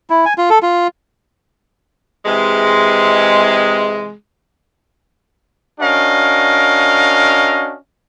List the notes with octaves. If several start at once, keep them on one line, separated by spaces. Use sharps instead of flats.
E4
G#5
F4
A4
F4
C3 E3 G#3
C#4 D4 F#4 A#4 D#5 F5